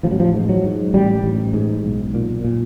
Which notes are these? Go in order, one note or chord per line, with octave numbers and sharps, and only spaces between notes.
A1 F3
F#3
F3
G#2
F#3
G#2
A1 G3
A1
G#2
B1
A#2
A#2